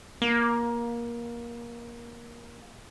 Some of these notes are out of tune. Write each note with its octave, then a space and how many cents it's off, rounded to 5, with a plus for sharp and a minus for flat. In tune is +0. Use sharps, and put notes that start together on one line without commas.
A#3 +20